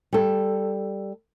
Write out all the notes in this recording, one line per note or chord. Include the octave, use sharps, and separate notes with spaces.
G3 A4